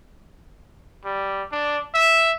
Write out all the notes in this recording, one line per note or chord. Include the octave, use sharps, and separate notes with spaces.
G3
D4
E5